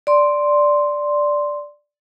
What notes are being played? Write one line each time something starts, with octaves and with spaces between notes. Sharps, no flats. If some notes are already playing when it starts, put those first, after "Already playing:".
D5 C6